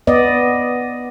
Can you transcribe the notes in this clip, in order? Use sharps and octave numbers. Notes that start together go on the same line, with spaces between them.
B3 D5 D#5